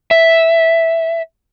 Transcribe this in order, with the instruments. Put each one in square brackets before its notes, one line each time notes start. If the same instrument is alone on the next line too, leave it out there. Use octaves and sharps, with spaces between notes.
[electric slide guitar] E5